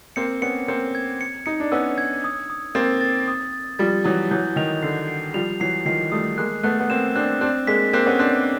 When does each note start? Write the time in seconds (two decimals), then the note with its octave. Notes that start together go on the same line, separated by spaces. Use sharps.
0.16 A#3 C4 C#7
0.42 B3 C#4 C#7
0.68 A#3 C4 C#7
0.95 G#6
1.21 C#7
1.46 D#4 C#7
1.60 D4
1.72 B3 C#4 E6
1.98 G#6
2.24 D#6
2.50 D#6
2.75 A#3 C4 A6
3.01 A6
3.28 D#6
3.53 A6
3.79 F3 G3 A6
4.04 E3 F#3 D#6
4.31 E3 F#3 G6
4.56 D#3 F7
4.82 D3 C7
5.08 C7
5.34 F3 G3 F7
5.60 E3 F#3 C7
5.86 D#3 F3 C7
6.12 G3 A3 D#6
6.38 G#3 A#3 F#6
6.63 A3 B3 F#6
6.80 B3
6.89 A#3 C4 E7
7.16 C4 D4 F#6
7.41 C4 D4 F#6
7.67 G#3 A#3 B6
7.93 A#3 C4 F#6
8.06 B3 C#4
8.19 C4 D4 F#6